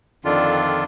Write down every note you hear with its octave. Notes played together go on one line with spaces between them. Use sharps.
F2 D3 D#3 D4 F4